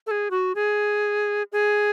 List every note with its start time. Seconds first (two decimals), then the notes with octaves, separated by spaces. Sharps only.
0.07 A4
0.11 G#4
0.31 F#4
0.55 G#4
1.52 G#4